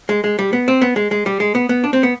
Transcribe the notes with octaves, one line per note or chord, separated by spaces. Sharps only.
G#3
G#3
G3
B3
C4
B3
G#3
G#3
G3
G#3
B3
B3
D4
C4
B3